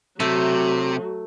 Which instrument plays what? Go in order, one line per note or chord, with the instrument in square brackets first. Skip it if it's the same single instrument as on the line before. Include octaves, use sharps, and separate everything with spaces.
[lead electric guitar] C3 [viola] F#3 [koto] A3